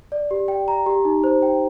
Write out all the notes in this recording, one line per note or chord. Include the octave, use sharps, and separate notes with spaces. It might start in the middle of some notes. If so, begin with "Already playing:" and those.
D5
G4
G5
A#5
G4
D#4
C5
G5